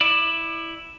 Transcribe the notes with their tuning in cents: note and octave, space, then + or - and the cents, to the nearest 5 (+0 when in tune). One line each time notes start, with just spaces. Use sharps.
E4 +0 D5 +25